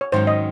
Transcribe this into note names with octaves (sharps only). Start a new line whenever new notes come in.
C#5
G#2 D#3 F#3 C#4 C5
D#5